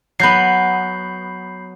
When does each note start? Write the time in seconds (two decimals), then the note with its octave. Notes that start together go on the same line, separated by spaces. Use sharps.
0.20 F#3 B3 B5 G6 C7